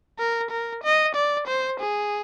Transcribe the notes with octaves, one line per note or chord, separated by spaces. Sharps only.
A#4
A#4
D#5
D5
C5
G#4